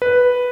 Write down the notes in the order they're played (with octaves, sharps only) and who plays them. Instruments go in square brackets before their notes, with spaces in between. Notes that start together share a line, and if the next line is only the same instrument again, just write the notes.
[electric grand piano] B4